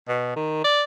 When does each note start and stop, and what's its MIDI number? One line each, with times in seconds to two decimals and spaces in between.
0.08 0.33 47
0.36 0.64 51
0.64 0.83 74